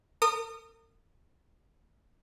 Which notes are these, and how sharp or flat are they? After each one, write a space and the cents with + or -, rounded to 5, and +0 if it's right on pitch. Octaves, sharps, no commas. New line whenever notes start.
A#4 -45 D#6 -20